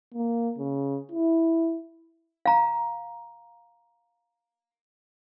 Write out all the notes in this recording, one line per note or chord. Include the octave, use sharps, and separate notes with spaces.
A#3
C#3
E4
F5 A#5